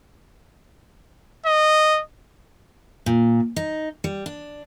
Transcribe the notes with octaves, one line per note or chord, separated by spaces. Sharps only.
D#5
A#2
D#4
G3
D4